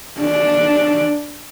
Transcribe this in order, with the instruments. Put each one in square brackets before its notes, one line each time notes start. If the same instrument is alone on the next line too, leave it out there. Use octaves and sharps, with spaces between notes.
[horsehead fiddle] D4